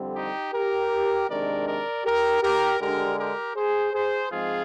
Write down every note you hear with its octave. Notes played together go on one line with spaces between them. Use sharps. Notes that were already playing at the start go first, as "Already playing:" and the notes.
Already playing: F2 D3 G3 C4
D#4 G4
G4 A#4
C3 D#3 G#3 D4 A#4 D5
A#4 D5
G4 A#4
G4 A#4
D3 G#3 D4 G4 A#4
G4 A#4
G#4 C5
G#4 C5
G#2 F3 G#3 C4 F4 G#4